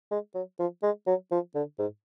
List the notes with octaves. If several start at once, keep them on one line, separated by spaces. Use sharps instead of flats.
G#3
F#3
F3
G#3
F#3
F3
D3
G#2